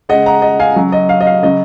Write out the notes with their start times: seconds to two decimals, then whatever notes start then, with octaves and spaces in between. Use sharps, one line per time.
0.09 C#3 G#3 D#5 F#5
0.26 F#5 A#5
0.42 D#5
0.60 F5 G#5
0.76 C#3 F#3
0.92 D#5
1.09 F5
1.21 D#5
1.27 F5
1.43 C#3 F#3 D#5